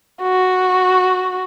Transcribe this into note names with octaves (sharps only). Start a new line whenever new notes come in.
F#4